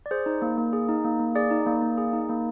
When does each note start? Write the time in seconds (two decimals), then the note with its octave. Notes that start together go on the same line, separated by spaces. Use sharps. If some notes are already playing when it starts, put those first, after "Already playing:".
0.06 D5
0.11 G#4 C5
0.26 D#4
0.42 A#3
0.58 A#3
0.73 G#4
0.88 D#4
1.04 A#3
1.20 A#3
1.35 G#4 D5
1.51 D#4
1.67 A#3
1.82 A#3
1.98 G#4
2.13 D#4
2.29 A#3